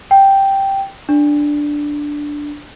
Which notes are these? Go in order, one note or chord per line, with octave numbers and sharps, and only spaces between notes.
G5
D4